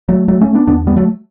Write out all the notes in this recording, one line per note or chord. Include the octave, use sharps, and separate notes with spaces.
F#3 A3
F#3 A3
A3 C#4
B3 D4
E2 D3 B3 D4
G3 B3
F#3 A3